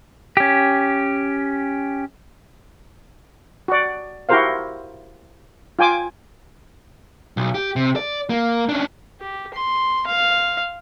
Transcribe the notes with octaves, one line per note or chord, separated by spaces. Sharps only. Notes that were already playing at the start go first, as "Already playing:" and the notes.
C#4 G4
F#4 D5
E4 F#4 G4 A#4 C5 F5
F4 G5 G#5 D6
B1
G4
C3
D5
A#3
C#4 D4
G4
C6
F5